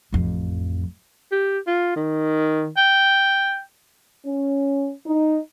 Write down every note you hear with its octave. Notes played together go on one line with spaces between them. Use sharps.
A1 F2
G4
F4
D#3
G5
C#4
D#4